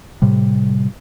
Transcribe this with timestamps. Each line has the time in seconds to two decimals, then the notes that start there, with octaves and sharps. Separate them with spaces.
0.22 A2 C3 G3